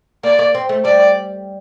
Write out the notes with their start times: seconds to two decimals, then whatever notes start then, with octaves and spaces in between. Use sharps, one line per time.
0.23 A#3 D5
0.39 A#3
0.55 C4
0.69 A3
0.85 G3 D5